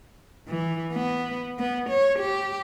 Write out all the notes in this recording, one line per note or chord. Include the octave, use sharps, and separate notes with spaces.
E3
B3
B3
C#5
G4